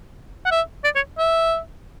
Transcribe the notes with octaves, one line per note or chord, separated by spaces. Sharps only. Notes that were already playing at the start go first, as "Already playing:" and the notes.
F#5
E5
D5
C#5
E5